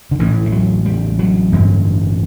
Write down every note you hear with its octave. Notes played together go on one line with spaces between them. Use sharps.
D3
A1 A2 E3
E3
F#3
G3
F#3
A1 G2 D3